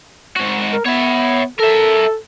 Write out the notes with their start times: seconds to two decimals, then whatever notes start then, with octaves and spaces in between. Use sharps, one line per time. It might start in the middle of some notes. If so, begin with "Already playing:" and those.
0.36 G#2 F#4
0.73 A#4
0.85 B3 C#5 E5
1.59 A4 A#4 E5